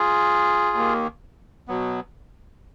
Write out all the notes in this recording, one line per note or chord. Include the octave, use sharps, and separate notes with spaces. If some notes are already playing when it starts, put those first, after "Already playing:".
Already playing: F4 G#4
D#2 D#3 A#3
B2 F#3 B3